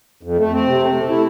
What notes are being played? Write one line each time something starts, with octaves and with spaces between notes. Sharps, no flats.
F2
A3
C4
C3
A3
A3
E4